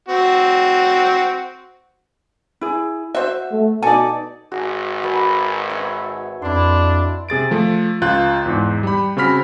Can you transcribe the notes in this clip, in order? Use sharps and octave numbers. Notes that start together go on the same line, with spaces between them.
C4 F#4
E4 G#4
F#4 C5 E5
A3
B2 D#4 A4 D5 G#5
G#1 F#4 G#4
F#4 A#4 B4
B4 C#5 E5
F2 D4 E4 C6
C3 G#4 A6 D7
F3 A3
C#2 F4 F#6 G6
E2 G#2
G3 B5
C#3 C4 F#4 B5 F6 B6